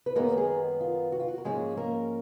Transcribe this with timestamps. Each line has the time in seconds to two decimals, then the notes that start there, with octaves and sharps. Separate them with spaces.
0.06 B4
0.15 F#2 D#3 G#3 A#3 B3 A#4
0.37 G#3 G#4
0.81 F4
1.12 F#4
1.20 F4
1.28 F#4
1.38 A#4
1.44 G#2 F3 G#3 A#3 C#4 G#4
1.77 A#3 A#4